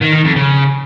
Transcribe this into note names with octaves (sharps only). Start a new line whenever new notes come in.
D#3
D#3
F2
C#3